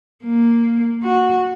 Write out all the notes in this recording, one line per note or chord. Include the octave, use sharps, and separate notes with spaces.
A#3
F#4